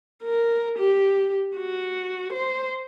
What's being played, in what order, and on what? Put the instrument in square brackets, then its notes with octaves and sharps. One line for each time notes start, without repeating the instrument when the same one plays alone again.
[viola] A#4
G4
F#4
C5